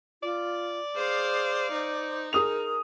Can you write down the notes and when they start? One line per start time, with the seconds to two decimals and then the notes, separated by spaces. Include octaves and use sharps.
0.23 F4 D5
0.96 G#4 C5 F5
1.72 D#4 C5
2.33 G#4 A#4 D#6 F7